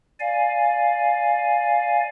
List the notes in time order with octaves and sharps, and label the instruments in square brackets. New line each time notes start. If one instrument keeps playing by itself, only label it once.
[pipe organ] D5 F5 G#5